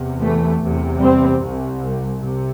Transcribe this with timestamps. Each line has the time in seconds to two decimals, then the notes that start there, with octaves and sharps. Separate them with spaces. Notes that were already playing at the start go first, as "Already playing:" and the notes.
Already playing: E2 C3
0.21 E3 A3
0.62 E2 C3
1.02 G3 C4
1.42 C2 C3
2.22 C3